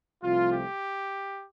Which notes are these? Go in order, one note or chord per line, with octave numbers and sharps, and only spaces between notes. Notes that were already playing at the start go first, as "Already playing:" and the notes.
C2 C3 F3 A3 F4
G4